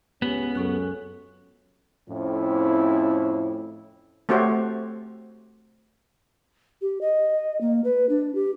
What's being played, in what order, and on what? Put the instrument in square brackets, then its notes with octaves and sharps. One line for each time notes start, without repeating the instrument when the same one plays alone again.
[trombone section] C#2 C#4 [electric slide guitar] B3 [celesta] G4
[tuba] F#2 [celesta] A4 C#6 F#6
[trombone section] F2 A2 C4 C#4 E4
[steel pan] A3 C4 F#4 G4 C5 C#5
[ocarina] G4
D#5
A#3
B4
D4
G4